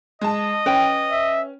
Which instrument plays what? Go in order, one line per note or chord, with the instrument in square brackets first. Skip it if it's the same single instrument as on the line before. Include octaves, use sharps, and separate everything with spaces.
[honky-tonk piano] G#3 A5 [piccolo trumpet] D#5
[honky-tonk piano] C#4 [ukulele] B4 G5
[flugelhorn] E5